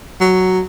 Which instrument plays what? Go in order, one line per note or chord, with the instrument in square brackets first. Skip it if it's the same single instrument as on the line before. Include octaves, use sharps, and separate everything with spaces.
[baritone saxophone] F#3